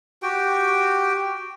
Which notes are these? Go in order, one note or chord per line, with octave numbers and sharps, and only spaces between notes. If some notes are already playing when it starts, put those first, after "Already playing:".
F#4 G4 G5